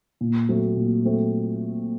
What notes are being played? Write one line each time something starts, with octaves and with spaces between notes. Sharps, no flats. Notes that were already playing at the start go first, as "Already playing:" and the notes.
A#2
F#3 A3 C4
A#2
F#3 A3 C4